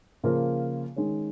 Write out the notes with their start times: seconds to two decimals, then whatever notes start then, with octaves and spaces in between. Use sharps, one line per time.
0.24 C#3 F3 A#3 F4 A#4
0.96 D#3 G#3 C#4